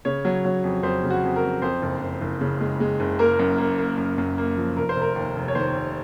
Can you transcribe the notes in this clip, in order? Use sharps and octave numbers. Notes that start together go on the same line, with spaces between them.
C#3 C#5
F#3
F#3
F2
F2 C5
C#3
F#4
F2
A#4
F2
F2 C5
F#1
F#1
F#1
C#3
G#3
G#3
F#1
A#3 A#4
F#2
A#3
A#3
F#2
F#2
A#3
F3
F1 A#4
C5
F1
A#4
D#2
F1
C#5
D#3 C5
F1